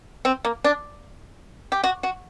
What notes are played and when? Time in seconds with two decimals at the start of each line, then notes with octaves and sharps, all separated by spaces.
0.25 C4
0.45 A#3
0.64 D4
1.72 G4
1.84 F#4
2.03 F#4